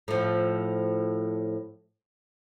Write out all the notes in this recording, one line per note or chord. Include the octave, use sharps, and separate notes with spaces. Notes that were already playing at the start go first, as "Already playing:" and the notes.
A2 F3